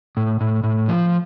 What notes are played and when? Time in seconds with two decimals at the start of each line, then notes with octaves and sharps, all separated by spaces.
0.17 A2
0.41 A2
0.64 A2
0.88 F3